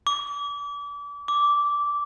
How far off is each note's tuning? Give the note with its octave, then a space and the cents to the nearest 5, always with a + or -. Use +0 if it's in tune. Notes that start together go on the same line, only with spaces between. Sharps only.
D6 -35
D6 -15